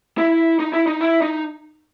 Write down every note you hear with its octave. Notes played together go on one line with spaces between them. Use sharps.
E4
D#4
E4
D#4
E4
D#4